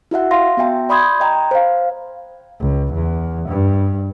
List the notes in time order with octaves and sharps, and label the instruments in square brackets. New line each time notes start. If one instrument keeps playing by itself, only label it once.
[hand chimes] E4 F#4 E5 F#5
F5 C6 A#6
B3 F#4 E5 G5 A5
D5 B5 C6 D#6 G6 G#6
D#5 G5 A#5
C5 F5
[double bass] C#2
E2
G2